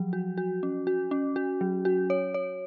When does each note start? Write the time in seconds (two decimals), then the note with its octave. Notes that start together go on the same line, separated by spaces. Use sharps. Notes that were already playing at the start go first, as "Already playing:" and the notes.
Already playing: F3 F#3
0.13 F#4
0.38 F#4
0.63 C#4
0.87 F#4
1.11 C#4
1.36 F#4
1.61 F#3
1.85 F#4
2.10 C#5
2.34 C#5